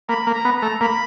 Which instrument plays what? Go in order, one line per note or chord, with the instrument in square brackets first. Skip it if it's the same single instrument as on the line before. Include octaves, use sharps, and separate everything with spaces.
[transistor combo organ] A#3 [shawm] B5
[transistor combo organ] A#3
[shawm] A#5
[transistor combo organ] B3
[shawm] A#5
[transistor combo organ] A3
[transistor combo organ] A#3 [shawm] B5